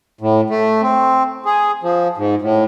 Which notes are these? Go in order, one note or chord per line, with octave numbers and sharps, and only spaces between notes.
A2
A3
C4
G#4
F3
G#2
A2